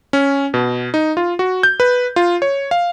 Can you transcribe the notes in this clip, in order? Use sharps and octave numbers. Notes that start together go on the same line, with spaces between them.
C#4
B2
D#4
F4
F#4
G6
B4
F4
C#5
F5